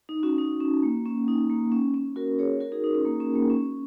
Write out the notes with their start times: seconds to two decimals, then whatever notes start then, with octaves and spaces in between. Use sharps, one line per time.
0.09 D#4
0.23 C#4 F#4
0.38 D#4
0.61 C#4
0.83 A#3
1.06 C#4
1.28 D#4
1.50 A#3
1.72 C#4
1.94 C#4
2.16 F#4 A#4
2.39 G#4 C#5
2.60 F#4 A#4
2.72 D#4 G#4
2.84 D#4
2.95 C#4
3.05 A#3
3.20 C#4
3.35 A#3
3.50 C#4